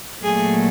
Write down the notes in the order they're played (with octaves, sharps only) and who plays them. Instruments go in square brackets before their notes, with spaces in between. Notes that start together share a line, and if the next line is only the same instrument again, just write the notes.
[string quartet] A#2 F#3 A3 G#4